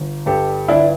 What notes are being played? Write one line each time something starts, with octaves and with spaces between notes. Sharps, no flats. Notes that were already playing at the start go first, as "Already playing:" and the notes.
Already playing: G1
G2 G4 A4
G1 D4 E4